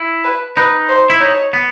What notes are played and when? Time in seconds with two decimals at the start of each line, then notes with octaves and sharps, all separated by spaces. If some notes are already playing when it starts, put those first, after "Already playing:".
Already playing: E4
0.24 B4
0.56 D#4 B4
0.88 C5
1.10 E4
1.20 D#4 C#5
1.53 B3